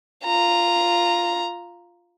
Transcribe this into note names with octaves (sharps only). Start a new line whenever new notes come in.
F4 A#5